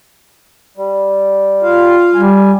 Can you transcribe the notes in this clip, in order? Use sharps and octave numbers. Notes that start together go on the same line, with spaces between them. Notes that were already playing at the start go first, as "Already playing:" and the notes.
G3
F4 F5
G3 G#5